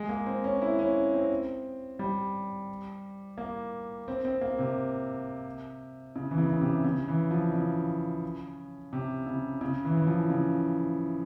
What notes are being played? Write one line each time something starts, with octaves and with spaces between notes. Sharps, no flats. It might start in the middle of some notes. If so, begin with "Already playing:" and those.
Already playing: G#3
A#3
C4
C#4
E4
C#4
C4
G3
A#3
C4
C4
A#3
C3
C#3
E3
C#3
C#3
C3
C#3
E3
F3
C#3
C3
C#3
C#3
E3
E3
F3
C#3